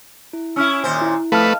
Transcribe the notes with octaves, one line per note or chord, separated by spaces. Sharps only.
E4
C#4 E4 E6 F6
D#2 A#2 C5
E4
F2 A3 B4 F5 A5 F6